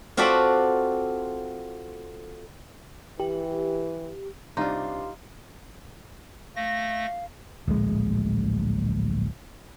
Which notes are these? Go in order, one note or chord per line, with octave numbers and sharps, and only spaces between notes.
C4 F4 F#4 A4 D5 B5
E3 G4
C2 D4 D#4 F4 G4 F5 C6
A3 F5 A#6
D1 A#1 G#3